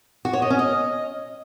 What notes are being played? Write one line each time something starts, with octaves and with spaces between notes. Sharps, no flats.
F#4
C#5
D#5
C#4
D#5